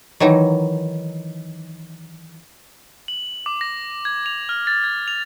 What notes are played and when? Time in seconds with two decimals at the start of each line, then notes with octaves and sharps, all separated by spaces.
0.20 D#3 E3 F#3 D#4
3.08 F#7
3.46 D6
3.61 A#6
4.05 G#6
4.26 F7
4.49 F6
4.67 A6
4.84 G#6
5.08 F7